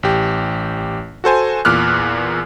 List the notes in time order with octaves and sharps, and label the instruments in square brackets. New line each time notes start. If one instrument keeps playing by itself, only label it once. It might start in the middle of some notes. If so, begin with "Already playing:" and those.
[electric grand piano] A1 G4
F#4 A4 C5 G#5
E2 A#2 D6 F6 F#6